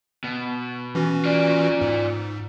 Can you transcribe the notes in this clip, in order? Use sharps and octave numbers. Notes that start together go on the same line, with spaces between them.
B2
E3 C#4 F#4
F4 D5
G#2